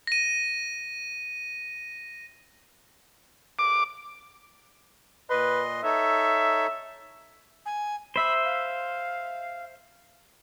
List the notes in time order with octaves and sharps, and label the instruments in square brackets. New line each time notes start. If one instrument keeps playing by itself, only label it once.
[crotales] A#6 D#7
[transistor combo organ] D6
[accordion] A#2 D#5 C6 [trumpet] B4
[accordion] D#4 A4 C#5 [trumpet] E5
[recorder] G#5
[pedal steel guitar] C5 E5 [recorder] B5
[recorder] F5